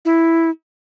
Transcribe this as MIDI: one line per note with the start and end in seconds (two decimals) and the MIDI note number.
0.05 0.50 64